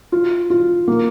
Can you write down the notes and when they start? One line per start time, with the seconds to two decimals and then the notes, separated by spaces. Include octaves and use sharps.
0.12 F4
0.50 F4
0.88 A#3